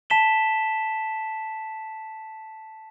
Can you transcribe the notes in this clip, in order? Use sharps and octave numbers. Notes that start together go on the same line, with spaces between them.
A5 B6 E7 G7